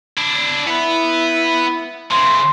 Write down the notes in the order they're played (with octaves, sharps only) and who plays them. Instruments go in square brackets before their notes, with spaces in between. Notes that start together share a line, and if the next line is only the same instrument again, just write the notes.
[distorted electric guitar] D4 E4
[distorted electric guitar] B3 B4 [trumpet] E4
[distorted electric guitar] C#3 E3 [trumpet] C6